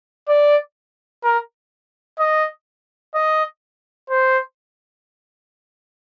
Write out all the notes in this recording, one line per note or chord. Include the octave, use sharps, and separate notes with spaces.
D5
A#4
D#5
D#5
C5